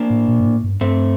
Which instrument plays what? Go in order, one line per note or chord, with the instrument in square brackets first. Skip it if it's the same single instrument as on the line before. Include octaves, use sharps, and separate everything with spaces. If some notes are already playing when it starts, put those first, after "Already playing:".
Already playing: [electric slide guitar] A#3 D4
[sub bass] A2
A#2
G2
A2
G2
[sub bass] G2 [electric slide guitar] A3 C4